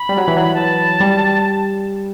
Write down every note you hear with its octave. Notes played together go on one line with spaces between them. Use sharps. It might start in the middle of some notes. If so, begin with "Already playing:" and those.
Already playing: B5
G3
F#3
E3
F#3
A5
G3